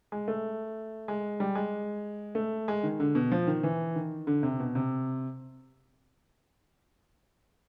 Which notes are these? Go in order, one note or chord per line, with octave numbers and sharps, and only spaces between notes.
G#3
A3
G#3
G3
G#3
A3
G#3
D#3
D3
B2
F3
D#3
E3
D#3
D3
C3
B2
C3